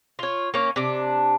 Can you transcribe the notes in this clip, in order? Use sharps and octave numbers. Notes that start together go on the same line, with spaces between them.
F4 C#5
A#3 C#4
C3 D4